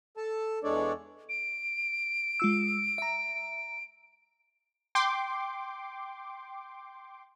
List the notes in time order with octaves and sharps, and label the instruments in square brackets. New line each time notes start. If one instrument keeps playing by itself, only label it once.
[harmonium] A4 A5
E2 G#3 D4 A4 C#5 D5
[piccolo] D7
[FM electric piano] G#3 F4 E6
E5 A#5
[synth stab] G5 C6 D6